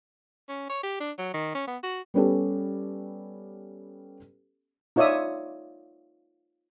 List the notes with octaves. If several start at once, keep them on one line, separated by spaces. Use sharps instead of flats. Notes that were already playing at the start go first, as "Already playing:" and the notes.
C#4
C#5
G4
D4
F#3
D#3
C#4
B3
F#4
G3 B3 C#4 G4 A4
D#4 F4 C#5 D5 E5 D#6